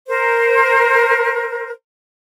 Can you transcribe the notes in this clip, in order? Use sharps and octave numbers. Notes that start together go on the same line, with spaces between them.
A#4 C5